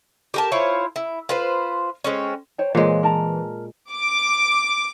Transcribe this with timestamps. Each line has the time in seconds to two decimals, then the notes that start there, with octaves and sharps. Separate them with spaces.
0.34 G4 A#4 A5
0.52 E4 F4 C5 C#5
0.96 E4
1.29 F4 B4 C5
2.04 G#3 C4 C#4
2.58 C5 C#5 G5
2.75 A#2 E3 G#3 A#4 C5 C#5
3.03 A#4 A5 A#5
3.91 D6